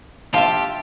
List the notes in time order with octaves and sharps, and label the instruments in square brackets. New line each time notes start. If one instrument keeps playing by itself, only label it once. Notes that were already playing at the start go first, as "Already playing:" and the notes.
[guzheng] F4 E5 [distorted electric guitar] G4 [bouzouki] A5